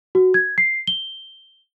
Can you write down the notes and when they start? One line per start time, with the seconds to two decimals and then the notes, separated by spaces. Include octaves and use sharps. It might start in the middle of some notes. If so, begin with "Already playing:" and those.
0.15 F#4
0.34 G#6
0.58 C7
0.87 G7